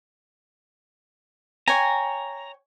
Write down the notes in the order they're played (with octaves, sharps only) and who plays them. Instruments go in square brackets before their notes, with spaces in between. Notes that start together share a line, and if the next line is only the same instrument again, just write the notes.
[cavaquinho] C#5 G5 G#5 [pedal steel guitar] A#5